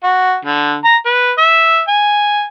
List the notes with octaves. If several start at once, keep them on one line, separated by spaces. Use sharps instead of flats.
F#4
D3
A#5
B4
E5
G#5